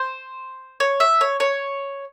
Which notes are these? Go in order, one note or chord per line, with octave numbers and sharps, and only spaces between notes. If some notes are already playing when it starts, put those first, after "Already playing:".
Already playing: C5
C#5
E5
C#5
C#5